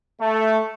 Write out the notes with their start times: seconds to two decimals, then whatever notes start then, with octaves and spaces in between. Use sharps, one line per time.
0.21 A3